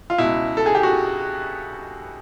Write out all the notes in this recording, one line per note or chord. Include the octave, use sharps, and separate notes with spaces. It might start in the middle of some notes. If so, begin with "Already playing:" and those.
F4
C#2 B2 E4
A4
G#4
G4
F#4